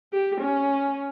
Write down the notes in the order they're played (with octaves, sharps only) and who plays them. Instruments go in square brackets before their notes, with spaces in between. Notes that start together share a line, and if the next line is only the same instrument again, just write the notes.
[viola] G4
C#4